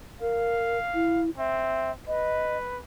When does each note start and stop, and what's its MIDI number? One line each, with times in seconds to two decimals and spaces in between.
0.21 0.78 70
0.21 1.23 77
0.94 1.30 64
1.38 1.91 60
1.38 1.91 76
2.07 2.79 71
2.07 2.57 75